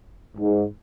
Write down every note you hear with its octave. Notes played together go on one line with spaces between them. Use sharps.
G#2